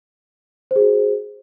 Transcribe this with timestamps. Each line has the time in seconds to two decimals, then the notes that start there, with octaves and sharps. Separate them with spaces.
0.71 C5
0.76 G#4
0.81 F#4